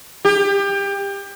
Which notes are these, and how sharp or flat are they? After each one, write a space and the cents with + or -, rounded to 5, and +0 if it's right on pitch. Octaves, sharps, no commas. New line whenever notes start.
G4 +25